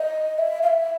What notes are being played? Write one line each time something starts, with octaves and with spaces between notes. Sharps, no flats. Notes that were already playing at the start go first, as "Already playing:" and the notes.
Already playing: D#5
E5
F5
E5